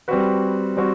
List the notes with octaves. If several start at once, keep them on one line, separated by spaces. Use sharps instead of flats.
G3 C4 F#4 B4
G3 C4 F#4